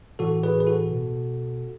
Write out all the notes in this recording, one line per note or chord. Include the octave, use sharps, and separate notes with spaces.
A2 E3 F#4 A4
G#4 B4
B4
F#4 A4
B2